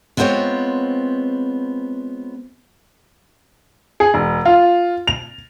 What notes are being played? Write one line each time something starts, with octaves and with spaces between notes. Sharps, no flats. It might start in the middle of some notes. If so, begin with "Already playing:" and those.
G#3 B3 C4 F4 C5 C#5
G#4
E1
F4
F7